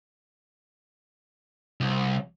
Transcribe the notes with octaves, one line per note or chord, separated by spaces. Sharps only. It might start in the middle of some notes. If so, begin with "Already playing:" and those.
C2